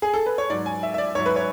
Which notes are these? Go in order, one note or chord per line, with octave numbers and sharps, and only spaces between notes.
G#4
A4
B4
C#5
G#2 F#3 D5
G#5
E5
E5
D5
G#2 F#3 C#5
B4
C#5